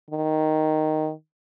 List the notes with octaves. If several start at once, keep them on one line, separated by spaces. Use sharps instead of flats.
D#3